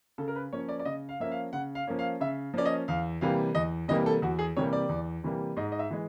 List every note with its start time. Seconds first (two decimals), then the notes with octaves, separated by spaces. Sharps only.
0.18 C#3 A4
0.28 A#4
0.36 B4
0.53 F3 A#3 C#4 C#5
0.69 D5
0.79 D5
0.85 C#3 D#5
1.09 F5
1.20 F3 A#3 C#4 E5
1.31 F5
1.53 C#3 F#5
1.75 F5
1.87 F3 A#3 C#4
1.99 F5
2.20 C#3 E5
2.54 F3 A#3 C#4 D5
2.65 D#5
2.88 E2 F5
3.21 C3 E3 G3 A#3 F5
3.55 E2 D#5
3.88 C3 E3 G3 A#3 D#5
4.06 A4
4.22 E2 F#4
4.39 G#4
4.57 C3 E3 G3 A#3 C#5
4.73 D5
4.89 E2
5.24 C3 E3 G3 A#3
5.56 G#2 D#5
5.72 D#5
5.79 E5
5.90 E3 G#3